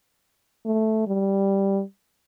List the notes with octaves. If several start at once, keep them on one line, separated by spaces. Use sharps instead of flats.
A3
G3